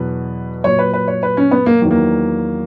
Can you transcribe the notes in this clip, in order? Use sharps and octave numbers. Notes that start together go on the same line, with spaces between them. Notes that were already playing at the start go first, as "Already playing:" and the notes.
Already playing: E2 B2 F#3 B4
A#2 F#3 C#5
B4
B4
C#5
B4
C#4
B3
A#3
E2 D#3 F#3
A#3